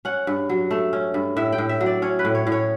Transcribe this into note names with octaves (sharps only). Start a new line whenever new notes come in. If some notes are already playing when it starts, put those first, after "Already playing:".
C#4 F#5
G2
F#3
A3
C#4
G2
A2 E5
G5
A2
E5
F#3
D5
C#4 C#5
B4
A2
C#5
A2
C#5